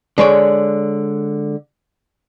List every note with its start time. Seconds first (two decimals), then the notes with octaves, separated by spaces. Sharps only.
0.18 D3 G#3 C#5 D5